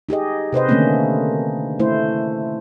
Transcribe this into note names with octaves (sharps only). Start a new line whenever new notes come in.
D#4 G4 G#4 D#5
C3 B4 C5 D#5
D3 D#3 A3 A#3 C4 C#4
A3 E4 C5